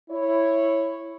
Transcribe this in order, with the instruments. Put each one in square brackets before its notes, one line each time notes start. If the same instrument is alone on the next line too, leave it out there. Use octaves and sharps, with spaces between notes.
[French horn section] E4 C#5